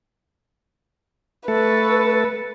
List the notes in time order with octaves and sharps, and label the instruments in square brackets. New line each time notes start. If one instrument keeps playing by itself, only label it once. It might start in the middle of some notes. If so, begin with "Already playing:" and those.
[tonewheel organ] A3 A4 [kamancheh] B4